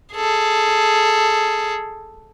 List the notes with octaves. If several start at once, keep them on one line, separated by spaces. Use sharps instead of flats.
G#4 A4